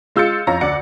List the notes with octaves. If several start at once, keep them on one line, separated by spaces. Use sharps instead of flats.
G#3 F4 E6 G6 A6 C#7
F2 C#5 F5 A#5 A#6
D2 D5 F#5 C#7